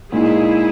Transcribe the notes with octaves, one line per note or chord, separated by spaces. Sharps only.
A#2 G#3 D#4 E4 G#4